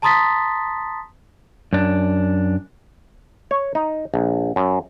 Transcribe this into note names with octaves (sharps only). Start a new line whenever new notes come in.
A5 A#5 C6 D#6 A6 B6
F#2 D4
C#5
D#4
A#1
F#2